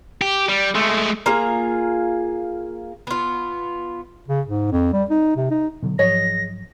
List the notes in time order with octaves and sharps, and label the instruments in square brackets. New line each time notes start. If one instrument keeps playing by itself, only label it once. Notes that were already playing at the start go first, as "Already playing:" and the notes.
[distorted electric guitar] G4
G3
G#3 A3
[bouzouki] A#3 F4 G#4 A#5
B3 F4
[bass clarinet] C#3
G#2
F2
G3
D#4
C3
D#4
[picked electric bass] B2 D3 F#3
[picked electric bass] G#2 F3 F#3 [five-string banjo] G#4 C#5 D#5 [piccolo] A#6